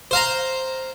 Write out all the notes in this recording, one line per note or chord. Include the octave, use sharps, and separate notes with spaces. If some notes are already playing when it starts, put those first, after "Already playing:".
C5 F5 A#5